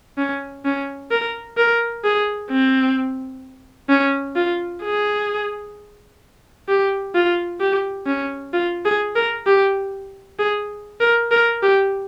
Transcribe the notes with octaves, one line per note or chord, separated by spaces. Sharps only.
C#4
C#4
A#4
A#4
G#4
C4
C#4
F4
G#4
G4
F4
G4
C#4
F4
G#4
A#4
G4
G#4
A#4
A#4
G4